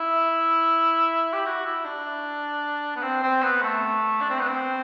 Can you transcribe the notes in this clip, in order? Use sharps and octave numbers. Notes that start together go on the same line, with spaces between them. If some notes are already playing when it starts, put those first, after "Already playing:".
Already playing: E4
G4
F#4
E4
D4
B3
C4
C4
B3
A3
D4
C4
B3
C4